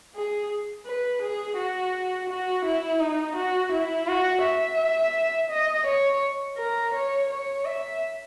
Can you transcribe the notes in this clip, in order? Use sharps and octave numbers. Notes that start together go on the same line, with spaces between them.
G#4
B4
G#4
F#4
F#4
E4
D#4
F#4
E4
F#4
E5
D#5
C#5
A#4
C#5
C#5
E5